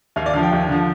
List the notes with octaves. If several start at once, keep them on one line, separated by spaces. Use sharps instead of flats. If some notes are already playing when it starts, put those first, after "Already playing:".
D#2 F5
D5
D3 F3 F5
G5
D#2
D3 F3